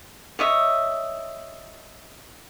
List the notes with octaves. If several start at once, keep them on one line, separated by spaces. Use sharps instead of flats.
C#5 D#5 E5